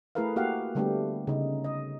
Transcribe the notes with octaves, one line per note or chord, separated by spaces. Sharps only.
A3 E4 G#4 A#4 B4 F5
A#3 F#4 G4 F5 F#5
D3 G3 A3 B3 D4 G4
C#3 D#4
D#5